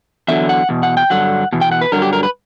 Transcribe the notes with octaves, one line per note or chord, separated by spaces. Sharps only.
E2 D3 F#3 E5
F#5
E2 B2
F#5
G5
G2 D3 F#3 F#5
E2 B2
G5
F#5
B4
G2 D3 F#3 A#4
G4
A#4
B4